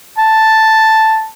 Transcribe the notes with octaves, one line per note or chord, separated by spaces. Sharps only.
A5